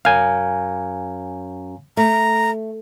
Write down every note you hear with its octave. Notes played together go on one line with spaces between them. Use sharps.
F#2 F5 G#5
A3 A#5